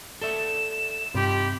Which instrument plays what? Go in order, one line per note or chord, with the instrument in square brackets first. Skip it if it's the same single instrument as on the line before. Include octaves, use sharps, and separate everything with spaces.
[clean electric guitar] A4 D5 E5 [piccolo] E7
[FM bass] G2 [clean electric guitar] C3 [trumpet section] D#4 F4 G4 [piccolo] B5